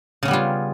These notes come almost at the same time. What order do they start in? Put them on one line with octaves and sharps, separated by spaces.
C#3 C#4 B3 G3 F4